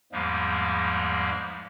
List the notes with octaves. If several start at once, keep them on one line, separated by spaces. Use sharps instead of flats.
E2 G#2 F3 G3 G#3 A#3